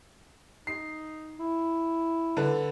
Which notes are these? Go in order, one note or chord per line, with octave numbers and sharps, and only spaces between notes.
D#4 C7
E4
D3 A4 B4